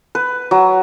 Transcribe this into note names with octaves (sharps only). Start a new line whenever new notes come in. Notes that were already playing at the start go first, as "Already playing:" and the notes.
B4
F#3